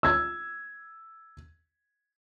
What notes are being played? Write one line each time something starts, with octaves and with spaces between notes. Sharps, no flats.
E6 G#6